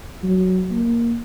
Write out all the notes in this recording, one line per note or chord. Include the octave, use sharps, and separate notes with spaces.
F#3
A#3